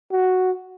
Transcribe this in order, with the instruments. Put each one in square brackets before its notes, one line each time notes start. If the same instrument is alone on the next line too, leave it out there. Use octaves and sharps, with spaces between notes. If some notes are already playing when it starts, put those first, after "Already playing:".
[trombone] F#4